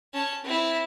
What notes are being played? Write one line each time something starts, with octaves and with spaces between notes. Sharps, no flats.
C#4 A5
C4 E4